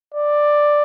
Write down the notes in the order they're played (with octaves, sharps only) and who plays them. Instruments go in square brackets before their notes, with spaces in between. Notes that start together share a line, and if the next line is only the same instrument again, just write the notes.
[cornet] D5